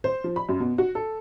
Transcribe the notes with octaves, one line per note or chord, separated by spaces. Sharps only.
C5
F3
B5
F#2
B2
F#4
A4